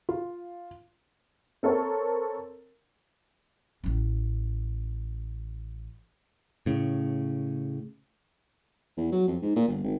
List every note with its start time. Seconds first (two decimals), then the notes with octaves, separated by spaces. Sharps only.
0.09 F4
1.63 C4 A4 A#4 C#5
3.84 A1 C#4
6.66 A2 C#3
8.97 E2
9.12 F#3
9.28 F2
9.42 G#2
9.56 A#2
9.68 G1
9.84 G#1